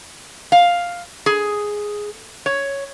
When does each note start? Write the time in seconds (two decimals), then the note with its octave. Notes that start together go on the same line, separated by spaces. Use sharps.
0.52 F5
1.26 G#4
2.46 C#5